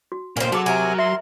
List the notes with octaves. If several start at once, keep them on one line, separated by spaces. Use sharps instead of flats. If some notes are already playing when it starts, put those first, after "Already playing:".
F#4
A#2 A#3 C#4 C5
F#3 F#4 G#4 A4 D6
C3 A#4 G#5
E5 C6